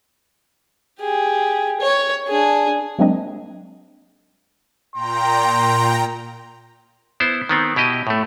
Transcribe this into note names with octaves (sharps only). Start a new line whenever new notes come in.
G4 G#4
C#5
D4 G#4
F#3 G#3 A#3 C4 D4 D#5
A#2 G5 A#5 C6
B3 E4 C5
D#3 B3 C4
B2 E4 G4 D#5
A2 A3